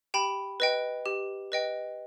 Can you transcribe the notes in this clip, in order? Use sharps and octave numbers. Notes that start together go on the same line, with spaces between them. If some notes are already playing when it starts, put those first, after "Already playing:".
G4 G5 B5
B4 D#5 G5
G4
B4 D#5 G5